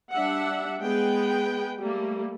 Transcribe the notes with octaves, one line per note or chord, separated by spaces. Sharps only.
G3 D4 E5 F#5
G#3 B3 G#4 B4 G5
G3 A3 A#3